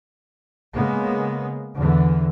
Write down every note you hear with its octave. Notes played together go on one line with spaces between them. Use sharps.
C#3 G#3 A#3 B3
E2 D3 E3